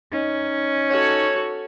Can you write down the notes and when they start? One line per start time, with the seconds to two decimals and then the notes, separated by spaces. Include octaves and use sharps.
0.12 C#4 D#4
0.90 F#4 A4 C#5